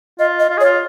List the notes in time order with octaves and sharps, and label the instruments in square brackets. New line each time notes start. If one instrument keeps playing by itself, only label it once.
[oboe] F4 [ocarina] D#5
[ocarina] D#5
[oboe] F4
G#4
[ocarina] C#5
[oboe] F4